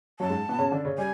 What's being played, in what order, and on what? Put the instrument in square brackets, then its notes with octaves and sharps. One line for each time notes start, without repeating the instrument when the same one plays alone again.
[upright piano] F#2 F#3 [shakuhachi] A5
[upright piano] G#2 G#3
B2 B3
C#3 C#4
D3 D4
C#3 C#4
[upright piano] G3 [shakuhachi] G#5